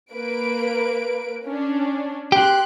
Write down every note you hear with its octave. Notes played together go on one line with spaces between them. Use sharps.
A#3 B4 D7
C#4 D4
G4 C6 F#6